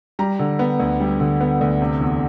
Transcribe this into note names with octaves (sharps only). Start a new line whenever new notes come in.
G3 A#5
D3
B3
D2
G3
D3
B3
D2
C3
E2